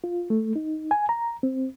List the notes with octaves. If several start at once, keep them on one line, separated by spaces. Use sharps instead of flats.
F4
A3
D#4
G#5
A#5
C4